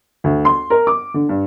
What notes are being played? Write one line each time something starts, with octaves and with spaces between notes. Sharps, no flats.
D2
C6
A#4
D6
D3
G2